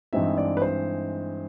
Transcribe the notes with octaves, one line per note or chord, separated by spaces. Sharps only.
G2 E3 G#3 C4 D#4 E5
D5
B4
C5